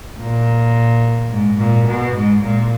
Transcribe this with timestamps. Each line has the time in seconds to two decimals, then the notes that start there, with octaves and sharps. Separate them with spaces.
0.19 A#2
1.30 G#2
1.58 A#2
1.87 B2
2.15 G#2
2.43 A#2